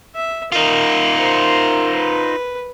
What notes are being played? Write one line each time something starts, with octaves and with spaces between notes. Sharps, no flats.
E5
D#4 F4 A#4
A#4 C5
B4